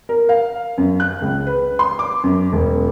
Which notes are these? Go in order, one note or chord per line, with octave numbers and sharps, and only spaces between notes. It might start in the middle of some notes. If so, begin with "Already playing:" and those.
A#4
F5
F#2
F#6
C#2
B4
C6
D6
F#2
E1